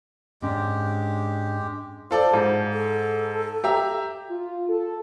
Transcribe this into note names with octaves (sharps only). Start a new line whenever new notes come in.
G#2 G#3 C#4 D4 G4
F4 A4 C5 D5
G#2
A4
G4 E5 A#5
F4
A4